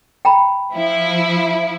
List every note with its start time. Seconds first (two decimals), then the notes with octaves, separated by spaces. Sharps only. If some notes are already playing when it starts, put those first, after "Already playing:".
0.25 G5 A#5 B5
0.74 F3 E4